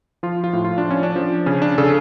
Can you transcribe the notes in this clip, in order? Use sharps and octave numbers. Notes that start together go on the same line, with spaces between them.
F3 F4
F4
A2
F4
D4
F3
C#4
D4
F3
C#3 C#4
D4
C#3 A4